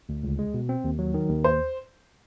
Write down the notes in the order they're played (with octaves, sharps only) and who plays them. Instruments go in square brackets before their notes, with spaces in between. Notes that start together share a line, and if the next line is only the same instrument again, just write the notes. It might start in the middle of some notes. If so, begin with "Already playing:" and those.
[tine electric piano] D2
C#2
G#3
B2
C4
D#2
F#3
D#3
D#2
[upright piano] C5